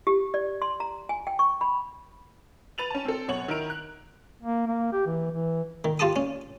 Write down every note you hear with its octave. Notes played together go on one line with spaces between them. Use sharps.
G4
D5
C6
A#5
G#5
G5
C#6
B5
B4 A6 F7 F#7
C#4 A5
C4 A4
F#2 B2 C#5 F#5 F#7
D#3 E4 A#5 D7 F7
F#6
A#3
A#3
G4
E3
E3
D#3
F4 G4 A5 A#5 D#6
C#4